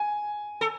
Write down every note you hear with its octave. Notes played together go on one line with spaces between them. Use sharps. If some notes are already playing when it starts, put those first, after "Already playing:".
Already playing: G#5
A4